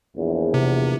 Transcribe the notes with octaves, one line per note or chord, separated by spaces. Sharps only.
A#1 E2
C3